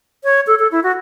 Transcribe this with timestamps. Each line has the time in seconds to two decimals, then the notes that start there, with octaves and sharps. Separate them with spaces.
0.24 C#5
0.47 A4
0.59 A4
0.72 E4
0.83 F#4